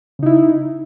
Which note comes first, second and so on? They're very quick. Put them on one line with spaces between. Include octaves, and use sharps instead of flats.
C#3 D#4 E4